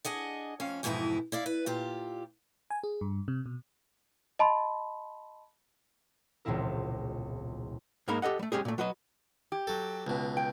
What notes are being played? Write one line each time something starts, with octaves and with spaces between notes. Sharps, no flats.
D4 G#4 D#5 F#5
F2 C#4 F5
F2 G#2 B2 E3 D#4 E4
E4 D5 F5
B4
A#2 F4 G4
G#5
G#4
G2
C3
B2
D#5 A5 B5 C6
E1 C#2 A#2 C4 E4 A#4
G#2 G#3 A#3 D#4 A#4 B5
G4 A4 D#5 F#5
G3 A3
G#3 C#4 G4 G#4
A#2 A3
F#3 F#4 B4 D#5
G4
F#3 A4
C#2 B2
G5